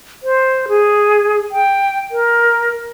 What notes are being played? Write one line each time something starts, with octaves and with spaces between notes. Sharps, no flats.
C5
G#4
G5
A#4